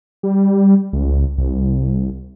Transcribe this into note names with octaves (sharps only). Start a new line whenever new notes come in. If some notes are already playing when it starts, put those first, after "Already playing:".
G3
C#2
C2